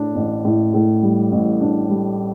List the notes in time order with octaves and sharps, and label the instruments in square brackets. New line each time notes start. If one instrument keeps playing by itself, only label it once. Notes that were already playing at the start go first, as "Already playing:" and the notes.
Already playing: [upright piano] A2 D4
A1
A2
A2
G3
A1
D4
G3